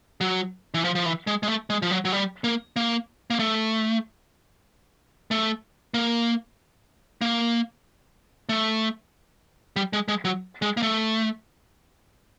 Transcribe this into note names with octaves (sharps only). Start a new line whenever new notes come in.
F#3
E3
F3
F3
E3
G#3
G#3
A3
G#3
F3
F#3
F#3
G3
A#3
A#3
A#3
A3
A3
A#3
A#3
A3
G3
G#3
G#3
F#3
G#3
A#3
A3